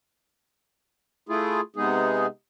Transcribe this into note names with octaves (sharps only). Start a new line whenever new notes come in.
A3 E4 F4 G#4
C3 G#3 B3 D#4 G#4